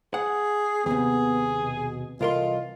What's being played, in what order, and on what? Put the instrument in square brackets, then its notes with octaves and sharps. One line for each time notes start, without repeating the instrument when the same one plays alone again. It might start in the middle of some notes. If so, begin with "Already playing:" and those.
[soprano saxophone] G#4 [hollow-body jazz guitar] F#5
[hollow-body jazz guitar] D#2 C3 [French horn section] B3 [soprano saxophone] G#4
[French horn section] B2
[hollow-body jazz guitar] C2 A#4 C6 [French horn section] E3 A4 D#5 [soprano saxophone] F4